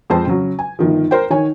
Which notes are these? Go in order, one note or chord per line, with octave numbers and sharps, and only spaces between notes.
F2 G#3 C4 C5 A5
C#3 F#3
G#5
G1 D#3 F3
A#4 C5 G5
D#3 C#5 G#5